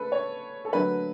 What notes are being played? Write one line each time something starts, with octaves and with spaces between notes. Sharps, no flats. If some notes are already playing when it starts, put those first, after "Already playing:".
Already playing: C#3 A3 A4 B4
C#5
A4
D3 F#3 A3 B4